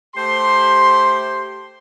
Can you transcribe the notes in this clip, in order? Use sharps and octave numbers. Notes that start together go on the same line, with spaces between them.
A3 G4 C5 C6